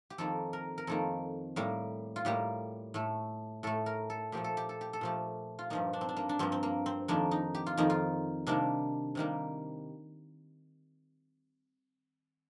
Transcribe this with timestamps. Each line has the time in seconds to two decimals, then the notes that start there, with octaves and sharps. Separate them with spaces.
0.10 G4
0.18 F2 D#3 A#3 A4
0.53 A#4
0.78 A#4
0.87 F2 D#3 A#3 A4
1.56 A2 G3 A#3
2.16 F4
2.25 A2 G3 A#3 G4
2.94 A2 A3
3.63 A2 A3 A4
3.86 A#4
4.10 A4
4.32 A#2 F3 A3 G4
4.44 A4
4.57 G4
4.69 A4
4.81 G4
4.93 A4
5.01 A#2 F3 A3 G4
5.59 F4
5.70 G2 F3 A#3 D#4
5.93 D4
6.01 C4
6.09 D4
6.16 A#3
6.29 D4
6.39 G2 F3 A#3 C4
6.52 C4
6.63 A#3
6.86 C4
7.08 F2 D#3 A#3 D4
7.31 D#4
7.55 G4
7.66 F4
7.77 F2 D#3 A#3 D#4
7.90 F4
8.47 C3 D#3 G3 A#3 D4
9.15 C3 D#3 G3 A#3